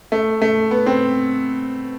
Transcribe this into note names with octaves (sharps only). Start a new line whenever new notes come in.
A3
A3
B3
C4